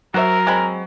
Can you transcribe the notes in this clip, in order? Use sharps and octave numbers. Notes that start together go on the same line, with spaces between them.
F#3 F#4 A#4 C5 E5
G#3 C4 B5